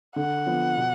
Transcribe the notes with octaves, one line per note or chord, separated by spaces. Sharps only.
D3 F#5
F3 B3 F4
B2